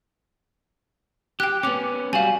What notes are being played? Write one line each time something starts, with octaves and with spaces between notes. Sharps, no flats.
G4 G5 F#6
B3 C#4 D6 F7
G3 F#4 F5 G#5